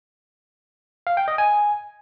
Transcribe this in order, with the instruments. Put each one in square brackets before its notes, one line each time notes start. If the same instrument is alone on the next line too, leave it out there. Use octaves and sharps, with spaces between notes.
[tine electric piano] F5
G5
D#5
G#5